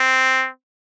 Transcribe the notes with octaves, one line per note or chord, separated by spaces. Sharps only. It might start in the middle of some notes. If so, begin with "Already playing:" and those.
Already playing: C4